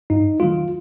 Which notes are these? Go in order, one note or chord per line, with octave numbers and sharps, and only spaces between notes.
G2 D#4
D#3 F#3 A3 F4